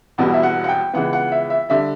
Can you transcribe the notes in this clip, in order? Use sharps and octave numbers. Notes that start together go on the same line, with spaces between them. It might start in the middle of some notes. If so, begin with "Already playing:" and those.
E1 E2 B2 G3 B3
E5
F#5
F#5
G5
C#2 C#3 E3 B3 F#5
F#5
E5
E5
D3 G3 E5